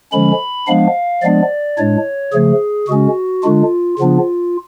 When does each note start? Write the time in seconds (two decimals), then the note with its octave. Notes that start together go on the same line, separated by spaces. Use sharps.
0.12 D3 F3 G#3 C#4 B5
0.67 F3 G#3 B3 D4 F5
1.22 F3 G#3 B3 D4 D5
1.78 A2 G#3 D4 C#5
2.32 C#3 F3 A3 G#4
2.88 C#3 G#3 C#4 F#4
3.43 D3 G#3 D4 F4
3.99 C#3 F3 B3 D4 F4